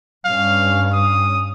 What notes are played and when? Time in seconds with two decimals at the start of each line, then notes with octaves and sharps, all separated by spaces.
0.25 G2 C#4 F5
0.93 D#6